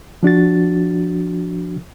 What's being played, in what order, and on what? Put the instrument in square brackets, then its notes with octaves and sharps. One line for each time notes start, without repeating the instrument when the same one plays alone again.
[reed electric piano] F3 D4 F#4 A6